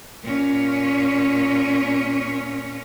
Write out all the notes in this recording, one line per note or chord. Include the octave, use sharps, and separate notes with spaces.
A#2 C#4